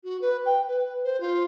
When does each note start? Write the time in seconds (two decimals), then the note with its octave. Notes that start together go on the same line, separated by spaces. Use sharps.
0.04 F#4
0.21 B4
0.46 G5
0.68 B4
1.04 C5
1.20 F4